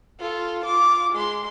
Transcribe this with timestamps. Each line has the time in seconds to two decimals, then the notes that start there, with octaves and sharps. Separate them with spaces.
0.20 F4 A4
0.65 F4 D6
1.12 G#3 C6